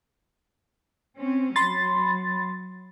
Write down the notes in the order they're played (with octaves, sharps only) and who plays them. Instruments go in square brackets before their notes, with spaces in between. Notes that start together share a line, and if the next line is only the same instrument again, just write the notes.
[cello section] C4 C#4
[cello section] F#3 [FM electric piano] B5 C6 A6